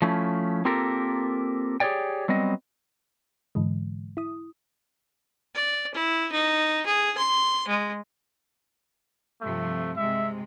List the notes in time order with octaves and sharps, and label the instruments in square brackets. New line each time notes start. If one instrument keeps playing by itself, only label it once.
[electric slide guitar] F3 A3 C#4 E4
A#3 C4 F4 G4 A4 A#4
G4 G#4 B4 C#5 D5 G5
F#3 G3 B3 C4 D#5
[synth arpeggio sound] G#2 D3 E3 G#3
E4 D#6
[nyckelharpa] D5
E4
D#4
G#4
C6
G#3
[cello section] G2 C3 F3 [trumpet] A3
[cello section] C3 G#3 [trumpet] E5